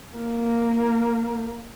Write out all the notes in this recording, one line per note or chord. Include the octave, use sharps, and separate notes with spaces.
A#3